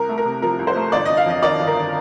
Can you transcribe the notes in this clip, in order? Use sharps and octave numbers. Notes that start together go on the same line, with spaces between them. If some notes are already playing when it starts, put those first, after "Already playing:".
Already playing: C2 A#4
A3
A#4
C3
F3 A#4
C2
C5
A3
G1 D5
G1 D#5
F5
F2 D#5
D#3 D5
G1
A#4
G1